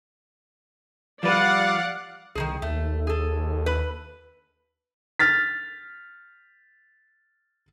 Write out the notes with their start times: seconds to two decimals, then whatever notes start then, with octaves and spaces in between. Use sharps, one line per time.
1.23 F3 G3 B4 D5 F5 F#5
2.35 C2 D#3 F3 G#4
2.62 D#2 A3
3.07 G#4 A4
3.66 B4
5.19 F6 A6 B6